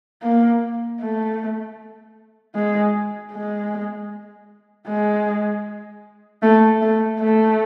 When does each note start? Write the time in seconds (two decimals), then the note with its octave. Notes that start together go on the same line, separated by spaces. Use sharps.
0.22 A#3
1.00 A3
2.55 G#3
3.33 G#3
4.87 G#3
6.42 A3
6.81 A3
7.20 A3